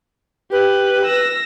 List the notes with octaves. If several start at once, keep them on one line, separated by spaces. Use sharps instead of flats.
G4 B4
E6 A#6